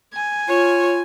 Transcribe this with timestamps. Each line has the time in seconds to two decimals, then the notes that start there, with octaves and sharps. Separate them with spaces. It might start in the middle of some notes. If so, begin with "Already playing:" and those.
0.14 G#5
0.48 F4 C#5